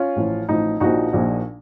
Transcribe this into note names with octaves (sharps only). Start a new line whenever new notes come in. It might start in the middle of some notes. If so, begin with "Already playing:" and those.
Already playing: C#4 F4
A1 A2 F3
A1 A2 F3 D#4
A#1 A#2 F3 D#4 F#4
A#1 A#2 F3